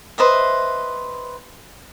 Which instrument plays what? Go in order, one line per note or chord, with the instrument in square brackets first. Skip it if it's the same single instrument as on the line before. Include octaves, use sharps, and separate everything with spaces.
[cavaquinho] B4 C5 D#5 E5